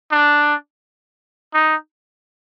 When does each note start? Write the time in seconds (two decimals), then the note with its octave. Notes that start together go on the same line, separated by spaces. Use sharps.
0.12 D4
1.54 D#4